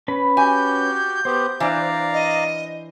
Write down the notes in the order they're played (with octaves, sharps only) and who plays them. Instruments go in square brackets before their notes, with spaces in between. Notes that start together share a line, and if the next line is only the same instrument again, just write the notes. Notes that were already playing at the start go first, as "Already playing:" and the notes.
[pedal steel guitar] C#4 B4 B5
[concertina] F#4 G4 [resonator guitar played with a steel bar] G#5 [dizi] G6
[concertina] B3 G4 [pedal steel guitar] C5
[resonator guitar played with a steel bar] E3 D4 [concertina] D5 F5 A#5
[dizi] D#5